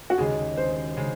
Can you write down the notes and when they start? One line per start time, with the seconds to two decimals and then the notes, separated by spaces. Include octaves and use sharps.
0.10 F#4
0.18 D#2 C#3 G#3 G#4
0.57 C5
0.97 C#3 G#3